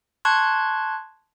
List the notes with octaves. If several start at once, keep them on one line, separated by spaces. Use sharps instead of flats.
A5 C6 C#6 F#6 G#6